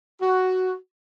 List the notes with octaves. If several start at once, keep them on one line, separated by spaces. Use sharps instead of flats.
F#4